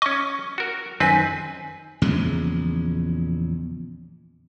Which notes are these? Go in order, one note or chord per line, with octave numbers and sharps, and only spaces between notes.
C#4 D#5 C#6
F#4 A#4
F#2 D#3 C4 B4 G#5 B6
A#1 E2 C#3 G#3